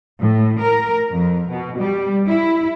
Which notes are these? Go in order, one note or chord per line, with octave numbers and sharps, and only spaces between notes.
A2
A#4
F2
B2
G3
E4